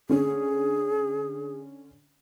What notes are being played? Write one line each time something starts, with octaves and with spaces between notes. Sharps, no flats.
D3 C#4 G#4